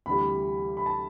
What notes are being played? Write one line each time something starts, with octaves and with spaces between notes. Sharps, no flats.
D2 C3 E3 G3 B5
B5
A5